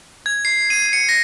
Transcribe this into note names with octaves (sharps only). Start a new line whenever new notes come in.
G#6
C7
D#7
C#7
A#6